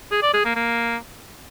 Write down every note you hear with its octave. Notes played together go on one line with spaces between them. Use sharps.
G#4
D5
G#4
A#3
A#3